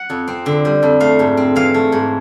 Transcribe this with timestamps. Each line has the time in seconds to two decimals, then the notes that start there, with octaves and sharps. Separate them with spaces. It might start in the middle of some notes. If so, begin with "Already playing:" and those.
Already playing: F#5
0.10 F2
0.28 C4
0.46 D3
0.65 G3
0.83 F2
1.00 A3 F5
1.19 G#2
1.37 C4
1.56 E3 F5
1.74 A3
1.92 G#2